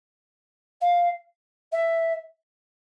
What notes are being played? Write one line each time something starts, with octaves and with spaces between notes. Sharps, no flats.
F5
E5